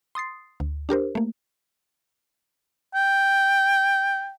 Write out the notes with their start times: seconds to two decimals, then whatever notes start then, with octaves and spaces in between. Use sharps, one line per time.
0.15 C6 D#6 A6 C7
0.60 D2
0.89 D4 G4 A#4 C5
1.15 A3 A#3
2.95 G5